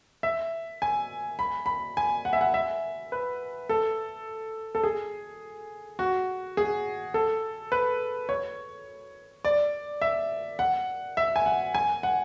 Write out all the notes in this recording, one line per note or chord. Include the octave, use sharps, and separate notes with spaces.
E5
G#5
B5
B5
G#5
F#5
E5
F#5
E5
B4
A4
A4
G#4
F#4
G#4
A4
B4
C#5
D5
E5
F#5
E5
G#5
F#5
G#5
F#5